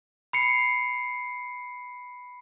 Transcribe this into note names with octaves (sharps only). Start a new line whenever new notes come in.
B5 C7 C#7